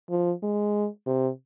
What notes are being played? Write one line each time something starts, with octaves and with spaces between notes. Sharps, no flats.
F3
G#3
C3